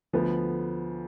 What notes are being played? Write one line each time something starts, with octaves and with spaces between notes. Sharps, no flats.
D2 D3 F3 B3